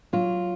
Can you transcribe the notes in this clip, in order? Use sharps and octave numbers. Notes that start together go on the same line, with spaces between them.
F#3 F4